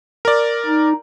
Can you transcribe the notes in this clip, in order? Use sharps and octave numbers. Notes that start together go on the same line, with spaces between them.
A#4 D5
D#4